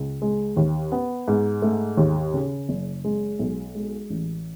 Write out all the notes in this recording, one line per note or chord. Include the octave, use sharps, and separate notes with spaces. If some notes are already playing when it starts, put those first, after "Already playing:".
Already playing: C#2
G#3
D#2
B3
G#2
A3
D#2
C#3
F#1
G#3
B1
G#3
A1